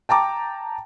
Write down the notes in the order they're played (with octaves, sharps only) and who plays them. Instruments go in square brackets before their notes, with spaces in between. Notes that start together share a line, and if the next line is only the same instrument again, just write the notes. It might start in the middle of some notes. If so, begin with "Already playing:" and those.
[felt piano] G5 A5 A#5 D6